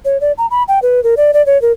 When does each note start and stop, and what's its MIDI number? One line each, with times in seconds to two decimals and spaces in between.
0.05 0.20 73
0.21 0.32 74
0.38 0.47 82
0.51 0.63 83
0.68 0.79 79
0.82 1.03 71
1.04 1.15 70
1.17 1.31 74
1.34 1.44 74
1.46 1.60 73
1.62 1.72 70